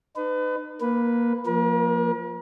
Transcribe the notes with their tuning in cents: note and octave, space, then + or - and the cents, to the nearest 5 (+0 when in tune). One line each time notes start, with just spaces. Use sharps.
D#4 -35 B4 +30
A#3 +15 B4 +0
F3 +0 A#3 +0 A#4 +45